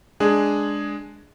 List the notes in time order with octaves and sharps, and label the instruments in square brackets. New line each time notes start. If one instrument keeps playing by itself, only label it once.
[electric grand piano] G#3 D4 G#4